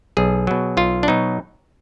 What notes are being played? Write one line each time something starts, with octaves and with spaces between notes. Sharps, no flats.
B1 G#4
B2 F#3
B1 F4
D4
B2 F#3 D#4